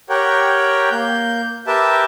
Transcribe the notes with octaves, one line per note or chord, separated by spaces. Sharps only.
G4 A#4 C#5 F#5 G5
A#3 G6
G4 A#4 B4 E5 G5 A5